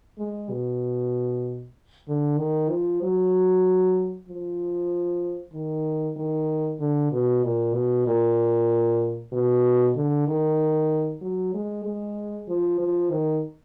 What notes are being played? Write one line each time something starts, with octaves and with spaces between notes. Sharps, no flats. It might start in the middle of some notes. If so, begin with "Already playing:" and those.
G#3
B2
D3
D#3
F3
F#3
F3
D#3
D#3
D3
B2
A#2
B2
A#2
B2
D3
D#3
F#3
G#3
G#3
F3
F3
D#3